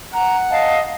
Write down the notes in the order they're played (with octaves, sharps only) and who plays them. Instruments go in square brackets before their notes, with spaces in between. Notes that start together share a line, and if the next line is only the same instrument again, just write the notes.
[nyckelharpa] F#5 [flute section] A#5
[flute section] D#5 F5 A5